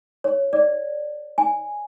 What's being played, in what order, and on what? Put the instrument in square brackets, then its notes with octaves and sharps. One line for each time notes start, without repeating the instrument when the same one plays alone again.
[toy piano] C#5
D5
G#5